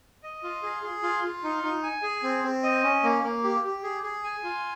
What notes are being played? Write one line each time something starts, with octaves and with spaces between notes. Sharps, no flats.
D#5
F4
G#4
G#4
F4
F4
D#4
D#4
G#5
G#4
C4
C4
D#5
C#4
A#3
A#3
G4
G4
G#4
G#4
G#5
F4